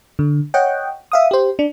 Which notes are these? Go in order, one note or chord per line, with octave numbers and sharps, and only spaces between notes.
D3
C#5 D#5 F#5 G5
E5 F5 D#6
G4 C5
D4